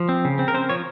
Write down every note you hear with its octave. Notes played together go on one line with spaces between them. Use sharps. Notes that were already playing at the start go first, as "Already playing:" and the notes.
Already playing: F3
C4
C#3
C4
A#4
C4 C5
F3 C#5